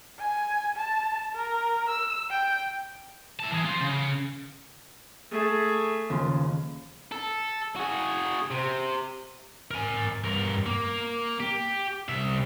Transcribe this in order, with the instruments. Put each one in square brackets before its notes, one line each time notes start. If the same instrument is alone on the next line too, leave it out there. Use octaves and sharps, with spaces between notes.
[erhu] G#5
A5
A#4
E6
G5
[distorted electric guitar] E4 A5
E3 G#4
F4 C5
C#3
[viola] A3 G#4
[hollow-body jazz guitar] D#2 C#3 F3
[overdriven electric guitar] A4
F#4 G#4
C3
[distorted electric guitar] A#4 G#5
G2 A#4
A#3
G4
C2 E5